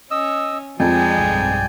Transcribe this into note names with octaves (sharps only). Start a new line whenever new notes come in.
C#4 D#5 E6
F2 F3 G#3 D5 G5 G#5
B1 G2